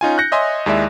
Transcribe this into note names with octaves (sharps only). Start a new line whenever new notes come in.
C#4 D#4 F4 G#5
F#6 G6 A#6 C#7
C#5 D#5 E5 G#5 C6
D#2 G#3 E4 D5 E5